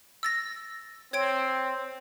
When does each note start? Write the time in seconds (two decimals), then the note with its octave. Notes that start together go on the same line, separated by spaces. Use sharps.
0.23 E6 A6 A#6
1.13 C4 C#5 G#6 D7